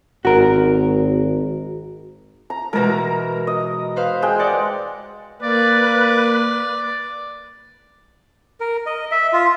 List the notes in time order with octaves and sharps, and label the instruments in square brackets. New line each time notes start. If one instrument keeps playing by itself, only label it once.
[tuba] G#1 [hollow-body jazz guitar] F#4 A#4
[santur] A#5
[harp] B2 E3 G#3 [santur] A#4 A#5
[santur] D#5
[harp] B4 C5 F5
[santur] G#3 G5
[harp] A#4 D5 F#5
[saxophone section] A#3 [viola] B4 [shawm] D5
[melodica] A#4
D#5
E5
F4